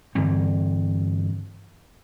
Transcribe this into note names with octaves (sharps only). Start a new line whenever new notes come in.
G2 D3 E3 C4